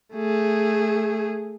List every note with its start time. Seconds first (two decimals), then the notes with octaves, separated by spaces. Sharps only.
0.14 A3 G#4